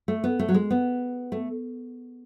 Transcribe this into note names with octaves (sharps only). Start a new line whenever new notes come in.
A3
B3
A3
F#3
G#3
B3
A3